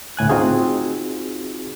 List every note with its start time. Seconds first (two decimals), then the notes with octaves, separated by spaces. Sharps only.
0.17 D2 A2 G#5 F#6
0.29 C4 D#4 F4 F#4 G#4